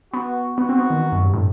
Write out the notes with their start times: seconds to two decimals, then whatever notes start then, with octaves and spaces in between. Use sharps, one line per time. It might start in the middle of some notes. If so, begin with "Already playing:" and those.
0.13 B3 F#4
0.58 B3 F#4
0.69 C4
0.79 B3
0.90 D#3
1.01 D#3
1.12 F#2
1.23 G2
1.34 A2